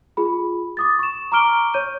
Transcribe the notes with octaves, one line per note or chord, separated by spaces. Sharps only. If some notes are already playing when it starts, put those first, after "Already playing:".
F4 G#4 B5
D6 D#6 A6
C#6 E7
A#5 C#6 D6 F6 D7 G7
C#5 G6 D#7